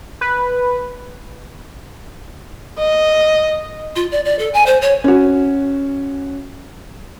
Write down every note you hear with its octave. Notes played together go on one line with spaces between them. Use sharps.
B4
D#5
F4
D5
D5
A4
G#5
C5
C#5
C#4 F#4